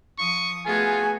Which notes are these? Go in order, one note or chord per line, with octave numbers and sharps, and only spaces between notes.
F3 C#6 D#6
A3 B3 F4 F#4 G#4 G#5